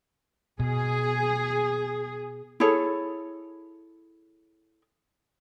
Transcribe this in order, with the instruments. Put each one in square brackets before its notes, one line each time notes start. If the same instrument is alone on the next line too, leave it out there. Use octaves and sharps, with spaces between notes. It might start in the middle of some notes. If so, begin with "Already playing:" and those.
[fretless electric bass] B2 [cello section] G#4
[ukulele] E4 G#4 A4 C#5